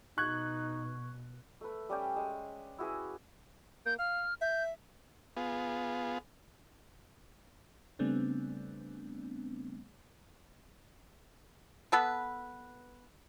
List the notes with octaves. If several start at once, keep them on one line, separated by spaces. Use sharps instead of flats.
B2 D#4 C#6 F#6 G#6
A3 B4
G3 C#4 D5 G5
G#3
E4 F#4 G#4 B4
A#3 G6
F5 F6
E5 G6
B3 F4 G#4
C#3 G3 A3 B3 C4 D4
B3 A4 B4